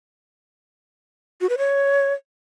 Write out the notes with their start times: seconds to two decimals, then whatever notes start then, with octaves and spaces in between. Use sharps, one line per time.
1.41 F#4
1.49 B4
1.58 C#5